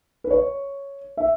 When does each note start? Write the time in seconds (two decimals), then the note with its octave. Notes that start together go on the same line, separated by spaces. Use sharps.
0.24 B4
0.31 C#5
1.17 E5